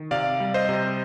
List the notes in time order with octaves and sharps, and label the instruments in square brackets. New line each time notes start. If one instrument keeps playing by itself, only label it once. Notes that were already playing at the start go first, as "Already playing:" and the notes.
Already playing: [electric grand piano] D#3
C3 D5 F5
G3
C5 D#5
C3